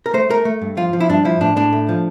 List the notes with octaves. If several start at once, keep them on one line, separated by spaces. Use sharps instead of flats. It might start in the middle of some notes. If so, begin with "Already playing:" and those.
A#4
A3 C5
A3 A#4
A3
G2
F3 F4
F3
E4
G2 D4
F3 E4
A2 D4
A2 D4
A3
F3